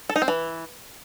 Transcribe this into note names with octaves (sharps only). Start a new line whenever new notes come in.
A4
D#4
C4
E3